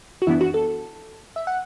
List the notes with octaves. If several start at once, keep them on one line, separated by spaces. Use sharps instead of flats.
F#4
F#2 E3 B3 D4 E4
F#4
A4
E5
F#5